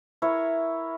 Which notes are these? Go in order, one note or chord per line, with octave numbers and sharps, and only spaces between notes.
E4 A#4 C#5